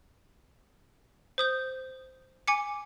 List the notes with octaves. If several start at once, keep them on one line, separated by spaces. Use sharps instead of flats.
C5 D#6 G6
G#5 D6 C#7